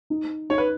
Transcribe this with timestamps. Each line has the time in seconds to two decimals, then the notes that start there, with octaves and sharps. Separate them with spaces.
0.10 D#4
0.50 D#4 C#5
0.58 B4